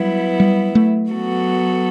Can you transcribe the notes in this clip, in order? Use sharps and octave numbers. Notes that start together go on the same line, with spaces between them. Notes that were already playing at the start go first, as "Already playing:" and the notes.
Already playing: F#3 G3 B3 E4
G3
A3
F#3 B3 F#4 A4